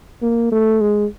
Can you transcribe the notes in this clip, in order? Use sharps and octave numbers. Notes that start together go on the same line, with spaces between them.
A#3
A3
G#3